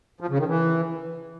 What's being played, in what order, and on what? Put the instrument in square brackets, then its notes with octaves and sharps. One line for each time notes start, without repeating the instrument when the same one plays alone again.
[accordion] F3
C#3
D#3
E3